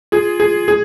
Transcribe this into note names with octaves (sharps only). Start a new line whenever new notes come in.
F4 G#4
G#4
G#4